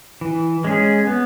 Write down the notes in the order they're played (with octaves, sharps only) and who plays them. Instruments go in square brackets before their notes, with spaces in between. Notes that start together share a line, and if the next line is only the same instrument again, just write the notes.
[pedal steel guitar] E3
G#3 C#4 G#4
B3